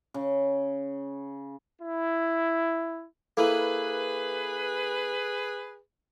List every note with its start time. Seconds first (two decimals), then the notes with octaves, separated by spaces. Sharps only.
0.14 C#3
1.82 E4
3.37 A#3 E4 G#4 A4 B4